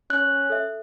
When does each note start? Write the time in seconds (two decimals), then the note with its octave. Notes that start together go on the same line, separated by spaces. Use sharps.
0.10 C#4 F#6
0.50 A4 E5